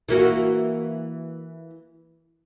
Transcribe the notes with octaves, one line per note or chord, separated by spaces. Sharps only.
E3 A#3 F#4